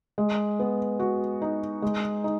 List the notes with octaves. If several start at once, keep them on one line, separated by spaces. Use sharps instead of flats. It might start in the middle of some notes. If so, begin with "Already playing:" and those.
G#3
B3
F#4
D#4
G#3
D#4